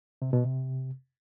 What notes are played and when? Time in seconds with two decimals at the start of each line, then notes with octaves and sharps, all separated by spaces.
0.22 C3
0.33 B2
0.44 C3